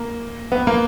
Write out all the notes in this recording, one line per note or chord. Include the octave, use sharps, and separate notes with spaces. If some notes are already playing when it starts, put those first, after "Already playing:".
Already playing: A#3
B3
A#3